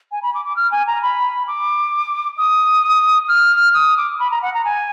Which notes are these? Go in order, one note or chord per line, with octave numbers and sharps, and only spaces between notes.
G#5
B5
D6
D6
F6
G#5
A#5
B5
D6
D#6
F6
D#6
D6
B5
A#5
F#5
A#5
G#5